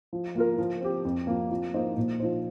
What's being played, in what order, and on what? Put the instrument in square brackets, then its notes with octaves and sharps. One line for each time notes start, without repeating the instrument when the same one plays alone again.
[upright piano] F3
A#3 F4 A#4
F3
C4 G4
F2
F3 A#3
F3
A#3 D#4 C5 D#5
A#2
F3 D#4 C5